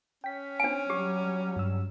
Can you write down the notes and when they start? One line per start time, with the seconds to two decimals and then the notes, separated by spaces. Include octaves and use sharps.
0.24 C#4 G5 B6
0.60 C4 D4 G#5
0.90 F#3 G3 G4 D6
1.56 G2 E6